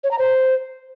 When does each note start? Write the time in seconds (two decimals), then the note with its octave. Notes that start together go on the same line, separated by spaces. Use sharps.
0.04 C#5
0.11 A#5
0.19 C5